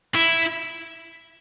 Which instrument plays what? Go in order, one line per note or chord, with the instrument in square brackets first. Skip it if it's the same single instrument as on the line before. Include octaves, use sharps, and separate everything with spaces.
[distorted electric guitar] E4